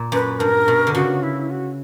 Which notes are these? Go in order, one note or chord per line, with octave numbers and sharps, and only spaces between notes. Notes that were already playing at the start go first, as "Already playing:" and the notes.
Already playing: A#2
F#2 B4
G2 A#4
B2
D3
C#3 F#4
E4
F#4